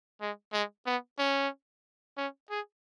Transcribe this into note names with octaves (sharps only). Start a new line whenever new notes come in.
G#3
G#3
B3
C#4
C#4
G#4